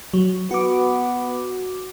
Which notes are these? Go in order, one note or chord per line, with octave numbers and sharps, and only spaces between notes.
F#3
B3 F#4 D6